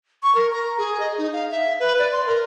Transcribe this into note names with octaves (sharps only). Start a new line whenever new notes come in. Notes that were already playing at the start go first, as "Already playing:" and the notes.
C#6
A#4
A#5
G#4
D#5
D#4
F5
E5
B4
D5
C6
A#4